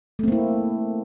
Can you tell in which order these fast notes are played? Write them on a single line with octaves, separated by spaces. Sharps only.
A3 C4 A#3 E4